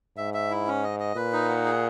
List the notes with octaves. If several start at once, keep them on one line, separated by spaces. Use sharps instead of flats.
G#2 E5
E5
E4
C#4
D#5
D#5
A#2 B4
D#4
F#5
G#4